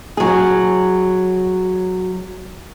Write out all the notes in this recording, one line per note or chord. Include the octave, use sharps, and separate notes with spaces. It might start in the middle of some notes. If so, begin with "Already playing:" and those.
F#3 G#4